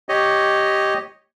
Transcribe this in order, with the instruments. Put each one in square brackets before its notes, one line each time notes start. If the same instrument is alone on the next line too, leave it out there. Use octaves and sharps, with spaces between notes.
[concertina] G4 C#5 D#5